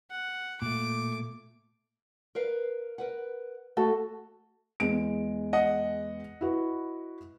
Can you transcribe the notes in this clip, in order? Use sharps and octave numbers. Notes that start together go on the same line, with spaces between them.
F#5
A#2 A3 D6
A#4 B4 F5
A#4 B4 F#5
A3 F#4 A4
E2 G#3 D7
D#5 F#5
E4 F#4 B4